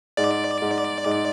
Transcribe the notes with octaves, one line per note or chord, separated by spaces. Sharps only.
G#2 D5
G#2
G#2